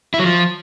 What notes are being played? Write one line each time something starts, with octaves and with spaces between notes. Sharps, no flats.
E4
F#3
F3